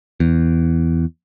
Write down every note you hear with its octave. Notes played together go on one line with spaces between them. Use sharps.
E2